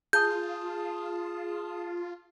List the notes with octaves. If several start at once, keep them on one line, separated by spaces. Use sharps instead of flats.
F4 G#4 A5 D#6 G6